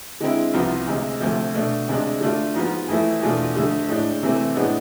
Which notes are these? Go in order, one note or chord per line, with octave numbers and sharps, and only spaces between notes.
D3 G#3 C4 E4
C2 C3 F3 B3 F4
D2 C3 G#3
D2 C3 F3 A3
B2 A3 D4
D2 C3 G#3 D4
D3 A3 D4 F4
G#2 F3 B3 F4
F2 E3 A3 E4
E2 B2 A3 D4 F4
F2 D3 A3
A2 G#3 D4
C3 E3 A3 C4
A2 G#3 B3 D4